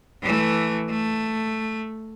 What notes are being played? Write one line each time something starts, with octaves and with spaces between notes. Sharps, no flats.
E3 A3
A3